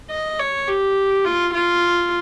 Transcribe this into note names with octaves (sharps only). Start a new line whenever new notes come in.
D#5
C#5
G4
F4
F4